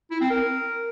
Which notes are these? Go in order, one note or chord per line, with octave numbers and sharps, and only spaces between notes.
E4
C4
A#4